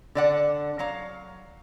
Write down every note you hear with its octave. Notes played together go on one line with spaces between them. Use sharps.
D3 D5 F#5
F#3 F5 A#5